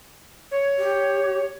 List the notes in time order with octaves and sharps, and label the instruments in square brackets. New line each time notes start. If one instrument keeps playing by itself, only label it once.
[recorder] C#5
[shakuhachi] G4